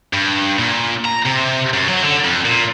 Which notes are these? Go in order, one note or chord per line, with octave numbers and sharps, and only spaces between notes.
G2
A#2
A#5
C3
F#2
F#3
D3
F2
A#2